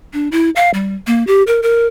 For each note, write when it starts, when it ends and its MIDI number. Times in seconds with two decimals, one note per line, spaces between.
0.13 0.29 62
0.32 0.50 64
0.56 0.71 77
0.74 0.95 55
1.07 1.25 58
1.27 1.43 67
1.47 1.61 70
1.63 1.87 70